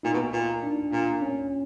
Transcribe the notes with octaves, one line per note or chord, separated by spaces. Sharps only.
A#2 D#4
B2
A#2
D4
A#2
C#4